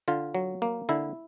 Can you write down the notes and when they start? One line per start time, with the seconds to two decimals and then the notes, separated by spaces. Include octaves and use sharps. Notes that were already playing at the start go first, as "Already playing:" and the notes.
0.08 D3 F4
0.35 F#3
0.62 A#3
0.89 D3 E4